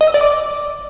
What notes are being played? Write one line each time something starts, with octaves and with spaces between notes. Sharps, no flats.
D#5
E6
D5
D6